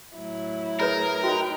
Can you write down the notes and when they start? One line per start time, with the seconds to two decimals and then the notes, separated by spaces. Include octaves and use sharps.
0.17 A2 F#3 E4
0.80 G#4 A#4 B4 C#5 A#5 B5
1.24 D#4 F#4 B4 G5